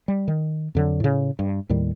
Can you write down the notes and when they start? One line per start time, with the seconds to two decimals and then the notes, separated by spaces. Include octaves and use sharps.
0.08 G3
0.28 D#3
0.75 F2 D3 F#3
1.00 A2 C#3
1.39 G2
1.69 D#2 A2 D#3 G3